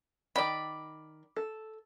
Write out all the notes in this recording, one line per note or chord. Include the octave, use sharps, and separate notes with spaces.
D#3 D5 G5 B5 D6
A4